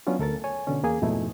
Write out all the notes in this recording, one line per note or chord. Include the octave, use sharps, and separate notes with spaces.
F#3 B3 C#4 D4 F4
D2 A4 A#4 A6
C#5 G#5
B2 D3 C#4
E2 A#3 G#4 G#5
F2 G#2 B2 A3 D#4 E4